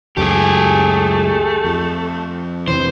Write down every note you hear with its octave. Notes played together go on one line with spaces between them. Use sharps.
C#2 F#2 A3 G4 G#4
F2
F2 C3 E3 C5